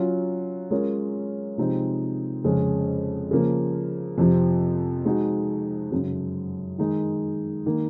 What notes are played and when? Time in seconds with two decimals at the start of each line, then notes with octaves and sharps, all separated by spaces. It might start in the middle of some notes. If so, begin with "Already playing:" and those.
Already playing: F#3 C#4 F4
0.71 G#3 C#4 F4 A#4 C#5
1.58 C3 F3 G#3 C4 D#4
2.44 F2 C#3 G#3 C#4
3.31 C#3 F3 A#3
4.18 F2 C3 F3
5.05 G#3 D#4 F#4
5.91 F#2 C#3 F#3
6.78 D#3 G#3 D#4
7.66 D#3 A#3